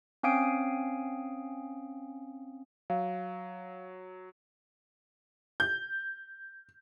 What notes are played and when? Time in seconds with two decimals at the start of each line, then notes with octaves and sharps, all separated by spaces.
0.23 C4 C#4 F5 G#5 D#6 D7
2.90 F#3 F5
5.60 G6